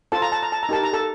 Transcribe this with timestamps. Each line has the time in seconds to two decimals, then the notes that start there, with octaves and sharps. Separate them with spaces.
0.12 F4 A4 C5 A5
0.22 A#5
0.32 A5
0.43 A#5
0.52 A5
0.63 A#5
0.69 D#4 G4 A#4 A5
0.83 A#5
0.93 A4 A5